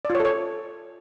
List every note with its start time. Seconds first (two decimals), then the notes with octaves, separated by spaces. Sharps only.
0.05 D5
0.10 F4
0.15 C#5
0.20 A4
0.25 C#5